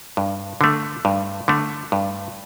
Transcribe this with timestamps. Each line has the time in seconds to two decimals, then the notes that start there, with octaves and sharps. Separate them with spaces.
0.17 G2
0.61 D3 A3
1.05 G2
1.48 D3 A3
1.92 G2